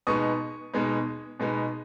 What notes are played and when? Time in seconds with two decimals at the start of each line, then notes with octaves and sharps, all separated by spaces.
0.07 B2 G#3 B3 D#4 C#6 D#6
0.74 B2 G#3 B3 D#4
1.40 B2 G#3 B3 D#4